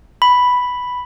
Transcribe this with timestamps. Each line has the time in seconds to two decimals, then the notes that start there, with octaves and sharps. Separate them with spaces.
0.22 B5